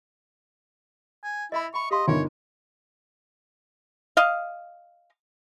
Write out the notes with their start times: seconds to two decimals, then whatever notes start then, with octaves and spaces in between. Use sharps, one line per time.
1.23 G#5
1.52 E4 D#5 E5 B5
1.74 G5 B5 C#6
1.91 G4 D#5 F5 C6
2.08 G1 D#3 F4 C#5 G#5
4.17 D#5 F5